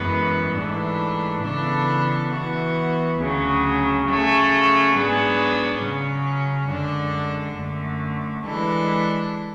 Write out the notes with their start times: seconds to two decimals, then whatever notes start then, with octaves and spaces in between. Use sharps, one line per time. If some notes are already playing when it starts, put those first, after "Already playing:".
Already playing: F#2 E3 G#3 B3
0.54 G#2 E3 A3 D4 A4
1.42 C#3 E3 B3 D4 A4
2.30 E3 B3 F#4
3.17 D2 C#3 F#3
4.05 C#3 F#3 A3
4.93 G#2 F#3 B3 D4 G#4
5.80 C#3 F#3 C#4
6.69 F#2 D3 G#3 D4 A4
7.56 F#2 D3 A3
8.44 E3 G#3 D4 A4